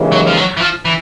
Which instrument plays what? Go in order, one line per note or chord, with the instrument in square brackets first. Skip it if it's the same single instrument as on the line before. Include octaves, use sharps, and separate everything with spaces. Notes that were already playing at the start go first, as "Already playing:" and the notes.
Already playing: [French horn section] D#2 C#3 E3 G#3
[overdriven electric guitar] F#3
F3
F#3
E3
F3
E3